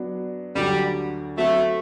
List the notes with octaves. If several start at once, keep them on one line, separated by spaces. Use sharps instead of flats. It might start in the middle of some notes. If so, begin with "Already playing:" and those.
Already playing: F#3 B3 D4
D2 D3 F#3 G3
F#3 A3 C4 F#4 A4